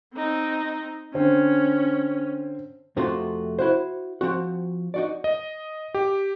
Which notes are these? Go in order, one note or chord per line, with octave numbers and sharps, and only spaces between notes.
C4 D#4
D3 C4 C#4
F2 C3 A3 F4 F#4 C6
E4 F#4 C5
F3 C4 F#4
D#4 F#4 D5
D#5
G4